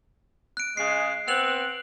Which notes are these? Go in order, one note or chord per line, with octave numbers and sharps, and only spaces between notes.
F#6 D7
C#3 G#3 C7
B3 C4 F#6 F7 F#7